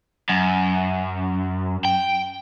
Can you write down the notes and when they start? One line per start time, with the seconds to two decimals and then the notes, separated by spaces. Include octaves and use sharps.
0.29 F#2
1.85 G5